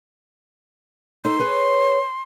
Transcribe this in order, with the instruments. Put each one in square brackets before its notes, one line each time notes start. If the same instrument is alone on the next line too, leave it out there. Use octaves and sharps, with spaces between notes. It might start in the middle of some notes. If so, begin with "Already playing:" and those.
[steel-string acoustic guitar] D#4 A4 [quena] C6
[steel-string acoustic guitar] G#4 B4 C#5